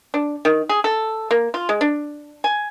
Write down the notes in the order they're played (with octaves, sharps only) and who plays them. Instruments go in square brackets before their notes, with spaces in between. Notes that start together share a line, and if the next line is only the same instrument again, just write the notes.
[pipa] D4
D#3
G#4
A4
A#3
F4
G#3
D4
G#5